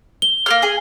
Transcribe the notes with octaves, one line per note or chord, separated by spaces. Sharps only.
G7
A#3 G#4 F6
G#4 G#5